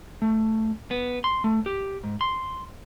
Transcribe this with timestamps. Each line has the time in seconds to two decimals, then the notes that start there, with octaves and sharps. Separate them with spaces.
0.22 A3
0.91 B3
1.24 C6
1.44 A3
1.66 G4
2.04 G#2
2.21 C6